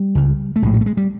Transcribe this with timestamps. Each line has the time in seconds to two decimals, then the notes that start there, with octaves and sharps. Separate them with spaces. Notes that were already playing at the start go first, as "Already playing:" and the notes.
Already playing: G3
0.15 C#2 C#3
0.56 A3
0.62 A#1 A2 G#3
0.74 F#3
0.81 A3
0.86 G#3
0.97 G3